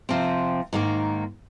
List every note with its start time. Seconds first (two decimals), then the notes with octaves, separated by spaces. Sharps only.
0.09 C3 F3 C4
0.73 G#2 D#3 A#3